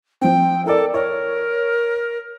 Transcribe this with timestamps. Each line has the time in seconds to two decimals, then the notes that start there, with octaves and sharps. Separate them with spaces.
0.21 F3 C4 G5
0.65 E4 A4 A#4 D5
0.94 A#4 C#5